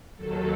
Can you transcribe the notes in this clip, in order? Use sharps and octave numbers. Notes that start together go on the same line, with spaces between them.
D#2 D#3 F#3 A4